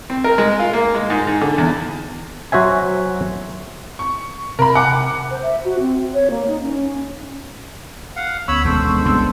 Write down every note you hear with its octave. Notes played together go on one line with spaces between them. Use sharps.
C4
A#4
G#3
F4
A#3
G#3
G#2
G#2
D3
E2
F#3 F#4 C5 E5 G#5
C#6
C3 A#4 B5
F#5 D6
C5
E5
F#4
C4
C#5
A#3
D#4
C#4
F5 F#5
D2 B3 C#4 C#5 B5 C#6 E6
E1 E2 D#3 G#3 A4 C5
G#3 B3 D4
F#1 C2 C#3 G#3 B3 C6 E6